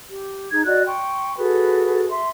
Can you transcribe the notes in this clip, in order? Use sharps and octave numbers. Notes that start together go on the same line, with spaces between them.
G4
D#4 G#4 G#6
F#4 D5 D#5 F#6
G5 C6 C#6
F#4 G#4 A4 B4
E5 C6